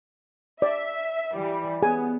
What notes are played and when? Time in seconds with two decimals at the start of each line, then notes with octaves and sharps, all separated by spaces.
0.62 D5 E5
1.34 E3 G3
1.83 B3 G#4 G#5